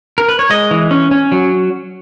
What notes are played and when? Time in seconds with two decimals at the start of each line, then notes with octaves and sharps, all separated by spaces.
0.18 A#4
0.29 B4
0.39 C#5
0.50 G#3 D#5
0.71 E3
0.91 C#4
1.11 C#4
1.32 F#3